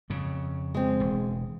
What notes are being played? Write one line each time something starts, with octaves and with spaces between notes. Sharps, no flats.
F2 C#3
G#3 C4
E1